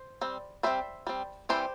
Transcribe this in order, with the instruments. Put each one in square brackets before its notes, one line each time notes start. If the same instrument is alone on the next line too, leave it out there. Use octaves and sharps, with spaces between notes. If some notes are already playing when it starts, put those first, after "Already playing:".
Already playing: [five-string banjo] C5
G3 C4
G3 C4 C5 E5
G3 C4
E3 G3 C4 G4 C5